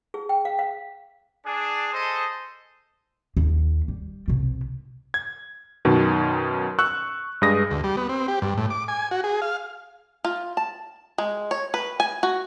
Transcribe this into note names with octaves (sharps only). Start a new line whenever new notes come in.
G#4
G5
F5
F5
D4 G#4
G#4 A4 C5 D#5
D#2
G3
C2 B2
G#6
F#2 B2 D#3
C#6 E6 F#6
G2 G#3 B4 D#6 A#6
D2
G3
B3
C4
G4
G2
A2
D6
G#5
F#4
G#4
F5
F4
A5
G#3
C#5
B4
G#5
F#4